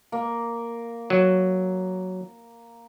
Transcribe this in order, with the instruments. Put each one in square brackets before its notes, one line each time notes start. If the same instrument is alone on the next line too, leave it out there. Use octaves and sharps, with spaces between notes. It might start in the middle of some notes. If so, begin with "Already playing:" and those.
[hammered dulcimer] A#3
[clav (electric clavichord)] F#3